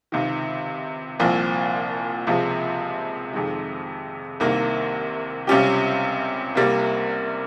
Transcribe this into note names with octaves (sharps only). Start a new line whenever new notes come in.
C#2 C3 D#3
C2 A#2 F3 C4
C#2 C3 F3 G#3
F2 C3 D#3 G#3
C2 C3 D#3 A#3
C#2 C3 G3 C#4 G4
C2 C3 G3 A#3